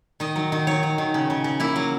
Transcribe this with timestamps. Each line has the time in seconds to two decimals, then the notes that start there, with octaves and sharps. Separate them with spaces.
0.20 D#3 D#5
0.36 F#3
0.52 D#3
0.67 F#3 C#5
0.83 F#3
0.98 D#3
1.14 C#3
1.30 C#3
1.44 C#3
1.60 A#3 E4
1.76 F#3